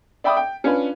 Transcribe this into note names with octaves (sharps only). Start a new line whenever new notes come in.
D5 E5 G5 B5 D6 D#6
G5
C#4 D4 F4 B4